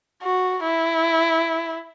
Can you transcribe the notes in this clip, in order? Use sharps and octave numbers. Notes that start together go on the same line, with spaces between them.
F#4
E4